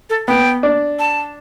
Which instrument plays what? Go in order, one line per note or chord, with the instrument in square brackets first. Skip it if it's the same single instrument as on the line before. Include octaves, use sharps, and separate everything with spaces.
[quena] A4
[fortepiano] B3 [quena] G5
[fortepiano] D4
[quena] A5